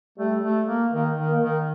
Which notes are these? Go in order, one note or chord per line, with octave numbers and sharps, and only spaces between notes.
G3 A3
A3
A#3
D#3 A#3
D#3
A#3
D#3